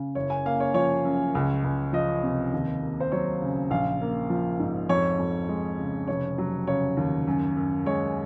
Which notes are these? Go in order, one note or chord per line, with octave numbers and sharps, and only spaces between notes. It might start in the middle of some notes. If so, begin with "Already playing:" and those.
Already playing: C#3
F#1 C#5
G#5
A#3 F5
C#5
F3 C#5
F#2
C#2
C#2
F3 D#5
C3
D#2
A#3
C5
F#3 C#5
C#3
A#1 F5
A#3
F3
G#2
F2 C#5
F2
G#3
C#3
F1 C#5
F#3
C#3 C#5
D#2
F#2
F#2
G#3 C#5